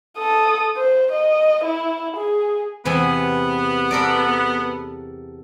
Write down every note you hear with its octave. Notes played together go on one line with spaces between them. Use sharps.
A4 D#6
C5
D#5
E4
G#4
E2 C3 B3 G#5
A4 A#4 D5